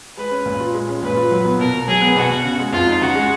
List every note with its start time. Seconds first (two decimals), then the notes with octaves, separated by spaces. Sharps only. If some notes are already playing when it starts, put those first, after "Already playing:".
0.17 G#3 B4
0.31 C#4
0.46 A#2
0.60 F4
0.74 G#3
0.89 C#4
1.02 A#2 B4
1.17 F4
1.31 F#3
1.45 B3
1.59 B2 A#4
1.73 B2
1.88 F#3 G#4
2.02 B3
2.16 B2 F#4
2.30 B2
2.44 C#3
2.59 G#3
2.72 F2 F4
2.87 D#4
3.01 C#3 F#4
3.15 G#3